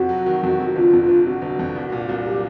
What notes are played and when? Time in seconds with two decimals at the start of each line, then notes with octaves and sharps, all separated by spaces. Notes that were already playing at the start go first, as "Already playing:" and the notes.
Already playing: F2 C3 F#4
0.09 F#3
0.26 D#3
0.43 F2
0.60 C3
0.76 G1 F4
0.93 F2
1.01 F4
1.09 G1
1.25 C3 F#4
1.42 G1
1.59 F2
1.76 C2
1.92 A#2
2.09 C2
2.26 F#3 G4